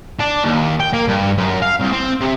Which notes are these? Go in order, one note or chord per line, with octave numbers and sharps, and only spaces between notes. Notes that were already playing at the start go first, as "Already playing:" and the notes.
D4
D#2
G5
A#3
G2
F#2
F5
C2
C4
C3